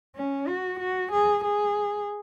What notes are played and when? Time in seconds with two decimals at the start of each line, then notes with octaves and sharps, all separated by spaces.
0.15 C#4
0.47 F#4
0.80 F#4
1.12 G#4
1.44 G#4